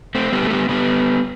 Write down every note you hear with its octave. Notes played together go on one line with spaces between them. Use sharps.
A3 C4
G3 B3
A3
G3 B3
G3 B3